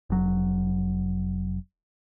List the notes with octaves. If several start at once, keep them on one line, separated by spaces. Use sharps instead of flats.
F1 F#3